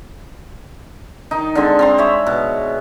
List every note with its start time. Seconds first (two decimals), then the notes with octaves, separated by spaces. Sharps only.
1.31 D#3 D#4
1.55 D3 G#3 C4 A4
1.79 C4 A#5 C6
1.98 C#5 E5 B5
2.26 B2